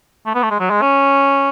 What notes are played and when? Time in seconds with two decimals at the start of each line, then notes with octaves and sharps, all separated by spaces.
0.26 A3
0.35 B3
0.43 A3
0.51 G#3
0.60 F#3
0.70 G#3
0.82 C#4